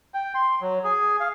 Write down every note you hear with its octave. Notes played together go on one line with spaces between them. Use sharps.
G5
C6
F#3
G#4
F5